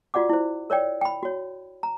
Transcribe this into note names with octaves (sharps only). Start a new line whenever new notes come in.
F4 F#4 D5 F#5 D6
E4 C5
A#4 C#5 D5 G5
G5 B5
F#4 C#5
A#5